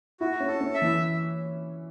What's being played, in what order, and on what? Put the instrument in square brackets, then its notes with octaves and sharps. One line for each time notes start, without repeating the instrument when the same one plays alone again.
[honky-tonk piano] E4 [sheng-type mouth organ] F#4
[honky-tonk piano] C#4
[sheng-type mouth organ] A4
[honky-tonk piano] C#4
[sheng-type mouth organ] E5
[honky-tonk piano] E3